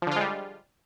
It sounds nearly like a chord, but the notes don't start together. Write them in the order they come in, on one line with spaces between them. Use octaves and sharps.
F3 D3 F4 G#3 G3